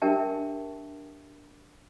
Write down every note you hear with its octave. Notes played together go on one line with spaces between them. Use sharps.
D4 G4 A#4 E5 G5 A5